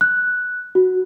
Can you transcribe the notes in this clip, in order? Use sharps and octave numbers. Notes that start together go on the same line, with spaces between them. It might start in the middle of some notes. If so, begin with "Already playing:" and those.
F#6
F#4